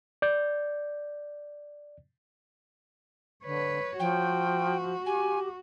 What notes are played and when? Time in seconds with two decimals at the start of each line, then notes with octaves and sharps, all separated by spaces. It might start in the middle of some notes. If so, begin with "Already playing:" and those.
0.22 D5 G6
3.45 D3 B4 C#5
4.00 F3 F#4 G5
5.06 G4 G#5